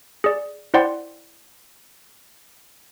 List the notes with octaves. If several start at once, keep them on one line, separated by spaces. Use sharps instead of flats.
G#4 D5
E4 C5 D5 F#5 G5 C6